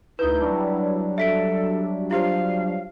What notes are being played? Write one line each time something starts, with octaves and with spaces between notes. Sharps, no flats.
D2 D#4 E4 B4 G6
F#3 G3 D4
A4 E5 B6 D7
F4 G4 C5 F5